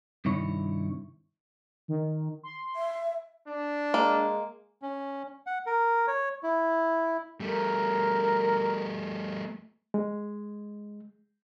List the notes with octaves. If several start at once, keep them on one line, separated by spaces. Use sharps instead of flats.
G2 C3 D#3 E4 C#5
D#3
C6
E5
D4
G#3 A#3
C#4
F#5
A#4
C#5
E4
G3 A3 A#4
G#3